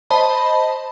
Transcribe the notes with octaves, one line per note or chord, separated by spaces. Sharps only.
C5 D#5 A5 B5